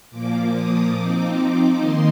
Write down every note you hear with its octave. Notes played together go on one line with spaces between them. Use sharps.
A#2 F3 A#3 D6
D#6
F3 C4 D#4 D6
D#3 A#3 D#4 C6